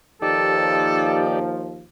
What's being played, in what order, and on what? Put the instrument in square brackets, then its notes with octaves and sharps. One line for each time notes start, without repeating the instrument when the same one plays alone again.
[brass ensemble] D#2 F3 [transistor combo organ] D#4 G4 D5 [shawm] A4